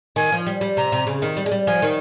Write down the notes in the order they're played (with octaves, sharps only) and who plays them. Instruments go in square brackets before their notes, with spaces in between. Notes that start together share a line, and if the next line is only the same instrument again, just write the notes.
[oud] D#3 [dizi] G#5
[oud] F3
G3
G3
[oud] C3 [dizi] A#5
[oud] C3
C#3
D#3
G3
G#3
G3
[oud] F3 [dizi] G#5
[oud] D#3